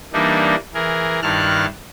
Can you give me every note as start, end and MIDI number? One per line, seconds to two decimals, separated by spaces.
0.13 0.55 52
0.13 0.55 55
0.13 0.55 58
0.13 0.55 62
0.13 0.55 63
0.74 1.20 52
0.74 1.20 68
0.74 1.20 70
1.22 1.66 43
1.22 1.66 51
1.22 1.66 64
1.22 1.66 81
1.22 1.66 89
1.22 1.66 90